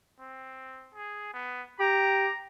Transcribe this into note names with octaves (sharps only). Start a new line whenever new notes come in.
C4
G#4
B3
G4 A#5